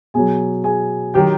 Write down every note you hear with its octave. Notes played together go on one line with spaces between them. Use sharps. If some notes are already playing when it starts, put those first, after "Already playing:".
B2 F#3 G#4 G#5
G#4 G#5
D#3 F#3 G4 G5